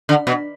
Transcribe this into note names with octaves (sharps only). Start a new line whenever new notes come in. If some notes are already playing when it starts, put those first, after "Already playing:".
D3
B2